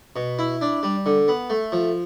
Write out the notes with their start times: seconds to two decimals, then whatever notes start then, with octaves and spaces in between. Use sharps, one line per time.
0.16 B2
0.39 E4
0.61 D4
0.83 G3
1.06 D3
1.28 B3
1.50 A3
1.72 F3